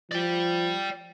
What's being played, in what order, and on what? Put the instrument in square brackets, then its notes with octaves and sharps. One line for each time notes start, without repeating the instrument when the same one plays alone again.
[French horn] F3 [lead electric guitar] D5 G5